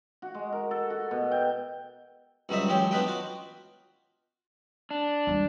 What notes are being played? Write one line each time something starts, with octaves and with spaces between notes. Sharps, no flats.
F#4
G#3
A#4
A4
F#4
B2
G5
C#2 F#3 G3 C4 D#5 E5
A1 F#3 G#3 G4 C#5 G5
B3 D4 F4 B4 D#5 G5
F4 F#4
D4
D#2 G3